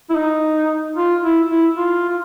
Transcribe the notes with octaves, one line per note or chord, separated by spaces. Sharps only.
E4
D#4
F4
E4
E4
F4
F4